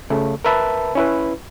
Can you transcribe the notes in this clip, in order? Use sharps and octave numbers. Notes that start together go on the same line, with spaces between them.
C#3 A3
A#4 B4 E5 A5 B5
C#4 E4 B4